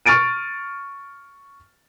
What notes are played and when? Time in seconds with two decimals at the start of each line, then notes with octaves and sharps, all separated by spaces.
0.06 C#6 F6 A6 D7 D#7